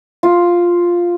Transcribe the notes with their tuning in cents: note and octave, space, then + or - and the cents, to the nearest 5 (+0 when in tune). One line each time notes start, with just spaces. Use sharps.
F4 +0